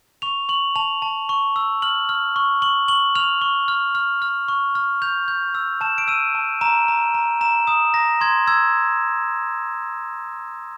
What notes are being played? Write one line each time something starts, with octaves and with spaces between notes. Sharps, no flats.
C#6 F7
C#6 F#7
A5 F7
A5
C#6
E6
F6 F#7
F6
C#6
C#6 F#7
C#6 F#7
F6 F7
C#6
F6
F6
F6
C#6
F6
G6 F7
G6
E6
A5 E7
D7
E6 D#7
A5
A#5 E7
A#5
A#5
A#5 E7
D#6 E7
A#5 A#6
C6 G#6
E6 G#6